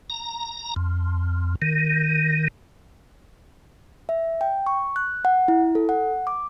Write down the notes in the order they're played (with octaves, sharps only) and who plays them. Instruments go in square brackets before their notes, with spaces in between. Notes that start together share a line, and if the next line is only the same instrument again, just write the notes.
[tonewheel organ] A#5
F2
D#3
[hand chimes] E5
G5
C#6
F#6
F#5
E4
A4
F#5
D6